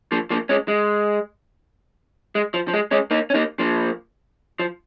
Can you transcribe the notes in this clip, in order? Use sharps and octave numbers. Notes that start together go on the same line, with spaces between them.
F3 A#3
F3 A#3
G#3 C#4
G#3
G#3
F3
F3
G#3
G#3 C#4
A#3 D#4
C#4
A#3 D#4
F3 A#3
F3